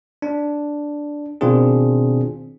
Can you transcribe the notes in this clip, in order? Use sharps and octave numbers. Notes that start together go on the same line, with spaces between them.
D4
B2 D#3 C4 D4 F4 G#4